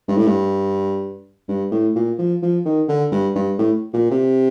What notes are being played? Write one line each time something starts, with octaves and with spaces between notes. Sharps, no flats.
G2
A2
G2
G2
A2
A#2
F3
F3
D#3
D3
G2
G2
A2
A#2
C3